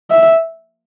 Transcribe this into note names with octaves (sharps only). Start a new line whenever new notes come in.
E5